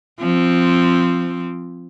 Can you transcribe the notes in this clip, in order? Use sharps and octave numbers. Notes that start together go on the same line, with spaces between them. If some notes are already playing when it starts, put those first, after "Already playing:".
F3 C4